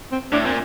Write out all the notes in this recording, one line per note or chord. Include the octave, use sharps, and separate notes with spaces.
C4
A2 D4
A#2 C4